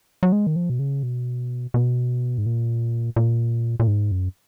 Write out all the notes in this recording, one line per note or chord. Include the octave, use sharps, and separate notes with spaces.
F#3
G#3
D#3
F3
B2
C#3
B2
B2
G#2
A#2
A#2
A#2
G#2
F#2